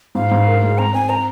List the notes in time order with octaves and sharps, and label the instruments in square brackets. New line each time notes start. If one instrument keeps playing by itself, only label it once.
[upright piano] G#2 [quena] F5
[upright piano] G#2
A#4
G#3
[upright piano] C4 [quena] A#5
[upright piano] C4 [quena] G#5
[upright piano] C5 [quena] A#5